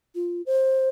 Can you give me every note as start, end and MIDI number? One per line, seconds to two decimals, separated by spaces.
0.15 0.42 65
0.46 0.89 72